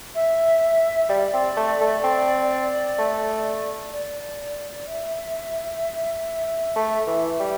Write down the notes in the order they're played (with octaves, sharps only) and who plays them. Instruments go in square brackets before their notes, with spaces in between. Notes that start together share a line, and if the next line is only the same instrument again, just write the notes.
[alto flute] E5
[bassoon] G3 [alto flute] D5
[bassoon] C4
A3
A3
C4
A3
[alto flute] D5
E5
[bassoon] A3
E3
G3